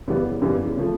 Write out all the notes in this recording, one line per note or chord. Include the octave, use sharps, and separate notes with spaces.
F#2 C#3 E3 G3 B3
F#2 C#3 E3 G3 B3
C#3 F3 A3